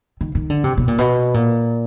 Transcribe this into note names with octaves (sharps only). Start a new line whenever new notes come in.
D#3
D#3
D3
C3
B2
A#2
B2
A#2